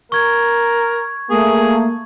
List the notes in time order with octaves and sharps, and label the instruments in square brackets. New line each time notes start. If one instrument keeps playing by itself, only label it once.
[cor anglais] A#4 [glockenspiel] C#6 G#6
[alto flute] A3 [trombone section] A#3 [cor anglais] G#4